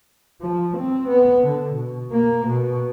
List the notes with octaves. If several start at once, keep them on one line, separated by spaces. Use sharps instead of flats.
F3
C4
B3
D3
B2
A#3
B2